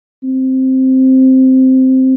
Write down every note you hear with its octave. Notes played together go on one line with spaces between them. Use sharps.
C4